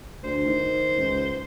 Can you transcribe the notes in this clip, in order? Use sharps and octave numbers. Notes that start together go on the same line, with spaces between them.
D2 C5
D#3
C#2